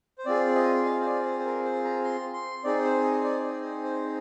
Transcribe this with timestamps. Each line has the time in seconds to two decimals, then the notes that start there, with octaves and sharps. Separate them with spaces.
0.18 C5
0.26 C4 F4 G#4 D5
0.55 D#5
0.85 F5
1.01 C5
1.05 D5
1.25 C5
1.40 C5
1.45 A#4
1.65 C5
1.85 A#5
2.04 C6
2.34 C6
2.64 C4 D#4 G#4 D5
2.84 C5
3.04 D#5
3.24 D5
3.44 D5
3.63 C5
3.84 C5